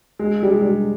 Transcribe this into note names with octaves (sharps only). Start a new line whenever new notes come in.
G#3
G3
G#3
G3